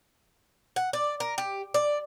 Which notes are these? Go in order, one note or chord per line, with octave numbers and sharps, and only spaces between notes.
F#5
D5
A#4
G4
D5